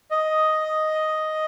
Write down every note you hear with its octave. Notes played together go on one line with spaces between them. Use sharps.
D#5